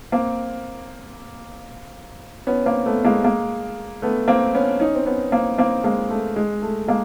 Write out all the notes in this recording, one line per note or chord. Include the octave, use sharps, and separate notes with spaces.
A#3 C4
B3 C#4
A#3 C4
A3 B3
G#3 A#3
G#3 A#3
A3 B3
A#3 C4
B3 C#4
C#4 D#4
C4
B3 C#4
A#3 C4
A#3 C4
G#3 A#3
A3
G#3
A3
G#3 A#3